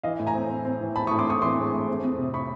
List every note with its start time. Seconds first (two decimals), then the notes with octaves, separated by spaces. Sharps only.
0.03 E3 D#5 F5
0.19 A2
0.27 G#5 A#5
0.34 C4
0.50 C4
0.65 C4
0.80 E3
0.96 C4 A5 B5
1.07 C#6 D#6
1.11 A2
1.18 C6 D6
1.26 C4 C#6 D#6
1.42 E3 C6 D6
1.57 G#3
1.73 A2
1.88 F2
2.03 F2
2.18 C3
2.34 B5 C#6